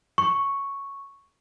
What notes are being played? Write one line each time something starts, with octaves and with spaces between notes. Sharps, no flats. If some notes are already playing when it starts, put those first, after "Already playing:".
C#6